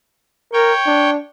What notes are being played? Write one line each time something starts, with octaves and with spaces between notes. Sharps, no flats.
A#4 C#5 G5
D4